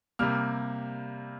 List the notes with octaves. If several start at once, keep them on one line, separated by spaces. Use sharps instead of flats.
C3 G3 A#3 F6